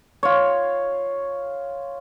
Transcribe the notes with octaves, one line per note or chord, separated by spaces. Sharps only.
F4 C#5